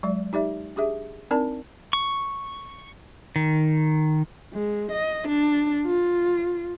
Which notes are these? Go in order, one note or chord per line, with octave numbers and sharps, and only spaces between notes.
F#3 G#3 D5
D#4 G4 D5 E5
D4 G4 G#4 E5
C4 D4 D#4 A#4 D5 A5
C#6
D#3
G#3
D#5
D4
F4